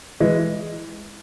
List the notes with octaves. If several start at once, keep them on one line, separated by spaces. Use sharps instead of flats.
E3 G#3